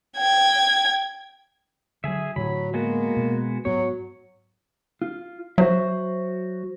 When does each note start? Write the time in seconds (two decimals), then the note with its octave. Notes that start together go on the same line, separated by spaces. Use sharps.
0.18 G5 G#6
2.04 D3 F#3 G#4 E5
2.36 A2 D3 F#3 B5
2.74 G#3 A#3 B3 F#4
3.17 B2
3.65 G#2 F#3 B3 C#5
5.02 F4
5.58 F#3 F#4 C5 E5